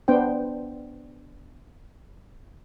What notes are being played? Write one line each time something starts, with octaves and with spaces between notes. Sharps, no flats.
B3 D4 C5 G5